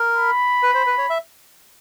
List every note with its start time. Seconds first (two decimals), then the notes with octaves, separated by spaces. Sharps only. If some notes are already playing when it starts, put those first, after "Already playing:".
Already playing: A#4
0.16 B5
0.63 B4
0.74 C5
0.87 B4
0.98 C#5
1.10 E5